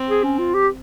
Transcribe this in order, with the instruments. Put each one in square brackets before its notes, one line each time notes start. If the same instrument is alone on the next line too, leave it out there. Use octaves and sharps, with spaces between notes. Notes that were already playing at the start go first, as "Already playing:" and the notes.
Already playing: [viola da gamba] C4
[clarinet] G#4
C#4
F4
G4